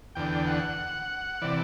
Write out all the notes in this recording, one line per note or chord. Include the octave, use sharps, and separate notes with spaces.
E2 D3 G5
F#5
C3 E3 D5